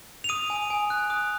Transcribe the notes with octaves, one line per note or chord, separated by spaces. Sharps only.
F7
D#6 D#7
G#5
G#5
F#6
D#6